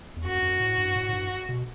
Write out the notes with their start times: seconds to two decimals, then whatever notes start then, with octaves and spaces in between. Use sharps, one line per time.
0.17 E2
0.24 F#2 F#4
0.43 F#2
0.60 A2
0.78 G2
0.96 A2
1.09 A2
1.13 G2
1.49 B2